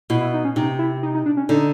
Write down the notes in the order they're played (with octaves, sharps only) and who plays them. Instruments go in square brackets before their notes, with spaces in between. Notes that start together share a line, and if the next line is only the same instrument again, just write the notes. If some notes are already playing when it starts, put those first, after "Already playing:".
[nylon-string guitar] B2 [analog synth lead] E4
[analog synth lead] E4
D#4
C#4
[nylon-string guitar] C3 [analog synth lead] D#4
[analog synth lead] E4
D#4
D#4
D4
C#4
[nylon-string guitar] D3 [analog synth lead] D#4